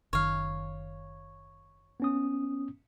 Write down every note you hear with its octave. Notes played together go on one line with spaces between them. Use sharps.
F#1 D#3 C#5 F5
B3 C#4 D#6